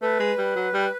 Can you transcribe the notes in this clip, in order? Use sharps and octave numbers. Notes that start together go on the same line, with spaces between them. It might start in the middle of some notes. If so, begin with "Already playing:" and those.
A3 B4
G#3
G3
F#3
G3